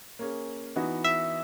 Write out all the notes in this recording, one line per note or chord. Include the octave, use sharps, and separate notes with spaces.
A#3 C#4 G#4
E3 B3 D#4 F#4
E5